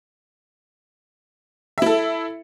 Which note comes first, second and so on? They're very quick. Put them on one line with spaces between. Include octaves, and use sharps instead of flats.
E5 E4 A4